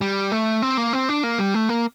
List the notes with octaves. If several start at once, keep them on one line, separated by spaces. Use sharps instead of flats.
G3
A3
C4
A#3
C4
D4
A#3
G3
A3
A#3